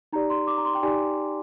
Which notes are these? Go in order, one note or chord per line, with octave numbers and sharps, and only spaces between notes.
D#4 G4 D5 A#5
C6
D6
A#5
C6
G5
D#4 G4 D5 G#5